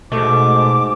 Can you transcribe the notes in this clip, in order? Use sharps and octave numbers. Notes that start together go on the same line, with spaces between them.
G#2 B2 A3 D6